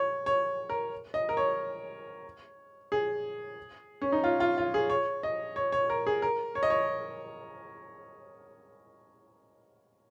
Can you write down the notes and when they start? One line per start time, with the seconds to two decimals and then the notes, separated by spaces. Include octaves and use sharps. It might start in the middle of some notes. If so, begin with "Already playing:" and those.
Already playing: C#5
0.26 C#5
0.70 A#4
1.14 D#5
1.29 A#4
1.37 C#5
2.92 G#4
4.01 C#4
4.12 D#4
4.24 F4
4.40 F4
4.58 F4
4.74 G#4
4.90 C#5
5.23 D#5
5.56 C#5
5.72 C#5
5.90 A#4
6.07 G#4
6.22 A#4
6.55 C#5
6.63 D#5
6.70 C#5